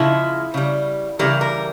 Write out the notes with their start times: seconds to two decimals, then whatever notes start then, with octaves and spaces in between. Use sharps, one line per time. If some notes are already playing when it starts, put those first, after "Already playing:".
Already playing: C#3 F3 G#3 E4
0.54 C#3 G3
1.19 C#3 E3 G3 A#4
1.41 A#4